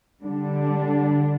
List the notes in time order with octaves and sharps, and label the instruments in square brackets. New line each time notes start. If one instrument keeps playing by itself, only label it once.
[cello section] D3 G3 D4